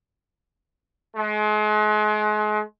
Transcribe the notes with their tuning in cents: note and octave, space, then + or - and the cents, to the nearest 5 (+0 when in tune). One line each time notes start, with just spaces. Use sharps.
G#3 +35